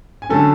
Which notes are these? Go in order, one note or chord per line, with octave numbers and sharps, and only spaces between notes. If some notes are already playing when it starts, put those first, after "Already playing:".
G#5
D3 F#3 A3 C#4 A4 A5